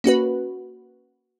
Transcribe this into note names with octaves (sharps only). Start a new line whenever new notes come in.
A#3 C#4 F#4 B4